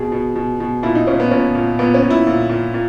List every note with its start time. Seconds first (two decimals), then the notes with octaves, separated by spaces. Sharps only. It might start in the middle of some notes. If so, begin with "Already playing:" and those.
Already playing: B2 G#4
0.12 B2
0.36 B2
0.60 B2
0.83 A#2 E4
0.95 D#4
1.07 A#2 C#4
1.20 B3
1.31 A#2 C#4
1.55 A#2
1.79 A#2 B3
1.94 C#4
2.02 A#2
2.10 E4
2.27 A#2
2.49 A#2
2.74 A#2